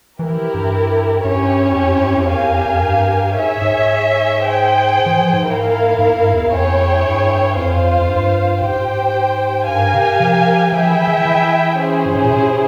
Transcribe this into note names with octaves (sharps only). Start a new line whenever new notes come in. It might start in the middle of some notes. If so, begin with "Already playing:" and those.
E3 E4 G4 A#4
G2
G2 C#4 E4 G4 C#5
E2
F2
G2
F2
E2 G4 A#4 F5 G#5
F2
F2
G2
G#2 G#4 C#5 E5
G#2
G#4 C5 G5
E3
F3
G#2
A#3 E4 A#4 F5
G#2
G2
E2
F2 E4 G#4 C#5 G5
G2
F2 F4 C5 F5
F2
G2
G#2 G4 C5 G5
G2 G4 A#4 F5 G#5
C3
F3
F3 E4 G#4 E5 G5
E3
E3
E3
C#4 E4 G#4 C5
G2
G#2
A#2
C3